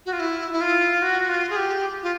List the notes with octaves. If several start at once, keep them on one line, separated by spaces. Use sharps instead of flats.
F#4
F4
E4
E4
F4
F#4
F4
G#4
G4
F4